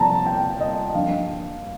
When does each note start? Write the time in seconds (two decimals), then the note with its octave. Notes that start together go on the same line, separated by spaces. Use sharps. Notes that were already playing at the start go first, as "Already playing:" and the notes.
Already playing: F2 C3 F3 A#3 A5 A#5
0.26 G5
0.61 D#5
0.94 G2 F3 A#3 F5